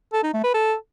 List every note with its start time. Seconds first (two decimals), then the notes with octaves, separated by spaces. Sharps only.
0.13 A4
0.23 D#4
0.33 A3
0.44 B4
0.54 A4